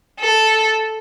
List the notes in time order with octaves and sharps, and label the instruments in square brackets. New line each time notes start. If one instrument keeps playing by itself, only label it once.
[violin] A4